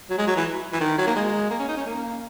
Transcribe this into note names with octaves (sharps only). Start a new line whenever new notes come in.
F#3
G#3
F#3
E3
E3
D#3
F#3
A#3
G#3
A#3
C#4
D#4
C#4
A#3